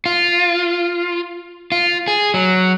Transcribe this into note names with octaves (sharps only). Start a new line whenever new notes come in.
F4
F4
G#4
F#3